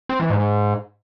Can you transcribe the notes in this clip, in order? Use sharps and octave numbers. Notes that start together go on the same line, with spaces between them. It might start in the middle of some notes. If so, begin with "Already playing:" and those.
C4
E3
G#2